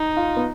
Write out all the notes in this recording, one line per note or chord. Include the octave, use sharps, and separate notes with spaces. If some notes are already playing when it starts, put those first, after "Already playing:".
Already playing: D#4
F4
B3